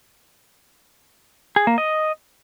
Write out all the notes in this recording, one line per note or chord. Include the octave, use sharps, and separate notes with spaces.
G#4
A#3
D#5